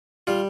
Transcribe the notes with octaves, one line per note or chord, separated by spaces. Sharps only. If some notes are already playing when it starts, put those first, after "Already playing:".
G3 F4